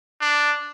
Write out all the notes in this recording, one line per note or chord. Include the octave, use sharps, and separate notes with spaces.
D4